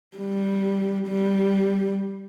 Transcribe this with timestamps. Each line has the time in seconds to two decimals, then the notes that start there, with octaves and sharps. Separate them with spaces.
0.17 G3
1.08 G3